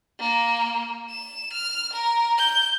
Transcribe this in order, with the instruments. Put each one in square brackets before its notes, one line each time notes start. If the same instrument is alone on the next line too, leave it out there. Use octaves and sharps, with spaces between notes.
[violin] A#3
E7
F6
A#4
G6